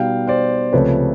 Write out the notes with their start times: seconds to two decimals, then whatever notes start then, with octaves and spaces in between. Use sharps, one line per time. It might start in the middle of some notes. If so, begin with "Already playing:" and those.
Already playing: B2 G3 B3 D#4 F5 G5
0.27 C5 D5
0.73 C#2 C3 F3 A3 B4 C#5